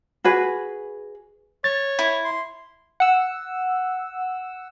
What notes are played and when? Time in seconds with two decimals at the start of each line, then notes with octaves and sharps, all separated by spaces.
0.24 F#4 G#4 B4
1.64 C#5 A6
1.99 E4
2.24 C6
3.00 F#5 E6